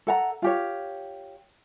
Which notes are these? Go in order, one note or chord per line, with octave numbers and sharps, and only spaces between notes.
A4 F#5 A#5
F4 G4 C#5